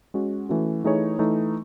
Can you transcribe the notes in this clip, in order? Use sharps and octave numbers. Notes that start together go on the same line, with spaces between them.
G#3 C#4 F#4
E3 A3 C#4 F#4
E3 A3 D#4 G#4 C#5
E3 A3 D#4